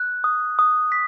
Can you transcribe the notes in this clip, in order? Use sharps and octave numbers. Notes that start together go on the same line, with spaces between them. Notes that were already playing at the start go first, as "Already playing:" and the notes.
Already playing: F#6
D#6
D#6
B6